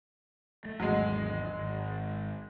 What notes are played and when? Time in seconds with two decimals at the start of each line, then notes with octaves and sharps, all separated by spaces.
0.65 A3
0.80 G#1 E2 F#3 G#3
1.58 G#1